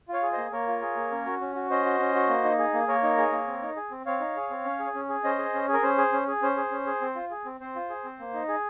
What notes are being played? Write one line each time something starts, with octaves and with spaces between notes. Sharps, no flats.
F4 C#5 F5
G#4
A#3 C5 D#5
A#3 A#4 C#5
F4
G#4
A#3
C#4
F#4
C#4
F#4
C#4 C5 D#5
F#4
C#4
F#4
A#3
D#4
G#4
A#3
A#3 A#4 C#5
D#4
G#4
A#3
C4
D#4
G#4
C4
C4 C#5 F5
D#4
G#4
C4
C#4
G#4
C#4
G#4
C#4 C5 D#5
G#4
C#4
G#4
A#4
C#4 C5
G#4
C#4
G#4
C#4 C5
G#4
C#4
G#4
C4
F4
G#4
C4
C4 C5
F4
G#4
C4
A#3
D#4
G#4